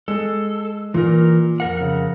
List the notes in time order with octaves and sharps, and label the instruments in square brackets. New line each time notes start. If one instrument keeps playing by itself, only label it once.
[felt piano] G#3 [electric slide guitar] A4
[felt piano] A#2 [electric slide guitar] E3 A#4
[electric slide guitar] F2 A#4 F#5
[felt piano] C#3